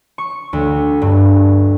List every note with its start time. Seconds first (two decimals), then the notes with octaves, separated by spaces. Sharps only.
0.18 C#6
0.53 D2
1.02 G2